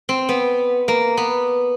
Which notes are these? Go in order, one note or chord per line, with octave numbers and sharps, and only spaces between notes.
C4
B3
A#3
B3